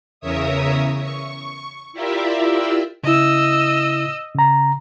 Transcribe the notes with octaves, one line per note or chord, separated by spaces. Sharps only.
E2 C#3 A#4 C#5 E5 D#6
C#6
E4 F4 G4 A#4 D5 E5
C#3 E4 D#5 E6
C#3 A#5